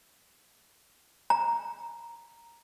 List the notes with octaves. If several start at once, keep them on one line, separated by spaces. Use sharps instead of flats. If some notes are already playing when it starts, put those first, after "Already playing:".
A#5